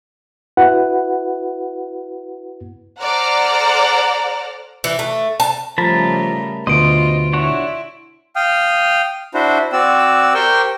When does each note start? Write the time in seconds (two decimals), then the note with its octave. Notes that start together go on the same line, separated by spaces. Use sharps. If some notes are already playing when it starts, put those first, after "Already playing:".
0.57 E4 F#4 B4 F#5
3.00 A4 C5 D5 F#5 A#5 F6
4.84 E3
4.99 A3
5.40 A5
5.78 C#3 F3 G3 A3 A#4 A5 B5
6.67 D2 B2 F4 C5 D#5 C6 D7
7.33 D4 E4 F#4 C#5
8.36 F5 G5 D#6 F6
9.34 D4 E4 F#4 C5
9.73 C4 F#4 D5 E6
10.34 G4 A#4 C5 G5 C6 C#6